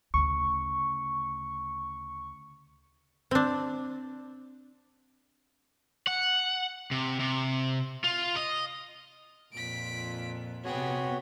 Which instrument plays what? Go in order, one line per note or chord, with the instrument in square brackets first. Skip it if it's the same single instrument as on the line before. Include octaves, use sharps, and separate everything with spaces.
[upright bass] D2 C#3 [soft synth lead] C#6
[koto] C4 D4
[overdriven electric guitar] F#5
C3
C3
F4
D#5
[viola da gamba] F2 A#2 [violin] B6 D7
[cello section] C3 B3 [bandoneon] F#4 C#5 [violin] G#4 G5